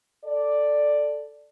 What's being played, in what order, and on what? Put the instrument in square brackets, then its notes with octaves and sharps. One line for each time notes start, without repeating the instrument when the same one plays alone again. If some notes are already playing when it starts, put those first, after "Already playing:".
[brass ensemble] A4 D5